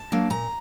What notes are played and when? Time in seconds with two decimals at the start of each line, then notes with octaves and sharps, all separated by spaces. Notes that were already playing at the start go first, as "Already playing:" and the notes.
Already playing: A5
0.12 F#3 A#3 D4
0.30 A#2 A#5